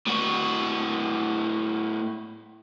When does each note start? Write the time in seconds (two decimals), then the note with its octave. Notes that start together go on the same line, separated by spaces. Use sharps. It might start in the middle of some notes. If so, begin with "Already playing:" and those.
0.07 A2 F#4